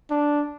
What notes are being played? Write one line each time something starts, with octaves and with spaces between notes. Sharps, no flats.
D4